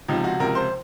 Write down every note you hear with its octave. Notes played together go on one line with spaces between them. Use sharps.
C#2 C3 F3 D#4
F#4
C#2 C3 F3 A#4
C5